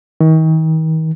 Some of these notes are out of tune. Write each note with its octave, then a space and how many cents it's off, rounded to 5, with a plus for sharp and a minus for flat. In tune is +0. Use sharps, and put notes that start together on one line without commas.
D#3 +40